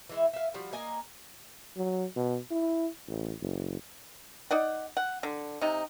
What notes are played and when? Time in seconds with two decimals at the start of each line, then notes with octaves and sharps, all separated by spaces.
0.09 E3 G#3 E4
0.33 E5 F5
0.54 F3 G3 F#4
0.73 A#3 D#5 G#5 A#5
1.77 F#3
2.16 B2
2.51 E4
3.07 A1
3.40 F#1
4.51 D#4 D5 F#5
4.97 F#5
5.23 D3
5.61 C3 D#4